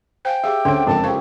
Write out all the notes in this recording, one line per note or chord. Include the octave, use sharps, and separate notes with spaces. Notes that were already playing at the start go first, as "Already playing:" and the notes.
C5 F5 G5 G#5
G4 G#4 E5 F5 D6
D2 C4 C#4 C#5 D7
F#1 F2 G#3 C5 G5 A5
G4 C5 C#5 F5